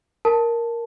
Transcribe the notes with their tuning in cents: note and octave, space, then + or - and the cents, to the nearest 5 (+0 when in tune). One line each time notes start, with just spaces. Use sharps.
A#4 +0 A5 +0